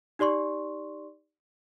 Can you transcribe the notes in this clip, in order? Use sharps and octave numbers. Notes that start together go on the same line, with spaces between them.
D#4 G4 D5 C6 C#6